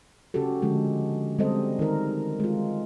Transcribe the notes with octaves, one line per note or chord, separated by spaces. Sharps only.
C#3 C#4 F#4 G4 A4
D3 F3 G#3 D4
G3 G#3 C4 A4 C5 D#5
D#3 A#4
G#3 F4